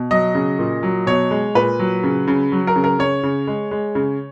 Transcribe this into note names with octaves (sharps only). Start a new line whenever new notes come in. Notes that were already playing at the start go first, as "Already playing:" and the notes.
Already playing: B2
F#3 D#5
C#3
A#2
F#3
B2 C#5
G#3
A#2 B4
F#3
C#3
C#3
F#3
A#4
C#3
A#4
C#3 C#5
C#3
G#3
G#3
C#3